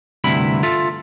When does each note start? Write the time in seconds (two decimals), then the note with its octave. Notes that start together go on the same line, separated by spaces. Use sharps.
0.24 D2 G2 C3 E4 B5
0.63 F4 A4 E5